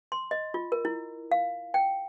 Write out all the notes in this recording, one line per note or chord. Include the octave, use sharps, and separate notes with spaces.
C6
D#5
F4
A#4
E4
F5
G5